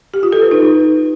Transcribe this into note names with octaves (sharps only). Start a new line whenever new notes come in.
G4
F4
A4
B4
D#4